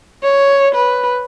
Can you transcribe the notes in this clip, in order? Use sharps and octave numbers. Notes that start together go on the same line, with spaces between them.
C#5
B4